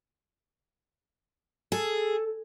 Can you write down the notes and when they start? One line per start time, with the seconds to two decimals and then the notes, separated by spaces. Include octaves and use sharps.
1.72 G#4 A4